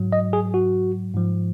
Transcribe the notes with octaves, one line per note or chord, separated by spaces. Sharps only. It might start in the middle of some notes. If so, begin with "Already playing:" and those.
Already playing: G#2 F#3
D#5
G#4
F#4
G#2 F3